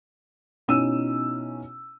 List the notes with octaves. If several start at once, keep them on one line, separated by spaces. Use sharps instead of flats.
B2 C#4 D#4 E4 E6 D#7